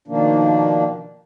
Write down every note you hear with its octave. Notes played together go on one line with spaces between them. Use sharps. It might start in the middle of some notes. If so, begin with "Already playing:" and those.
B2 D#3 F3 A#3 D4